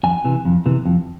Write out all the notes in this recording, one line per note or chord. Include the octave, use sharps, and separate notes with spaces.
F2 G#5
C3 E3
F2
C3 E3
F2